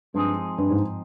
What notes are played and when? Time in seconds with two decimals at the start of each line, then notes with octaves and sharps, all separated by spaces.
0.14 G2 F3 G#3 C4 D#4 G#4
0.58 G2
0.70 G#2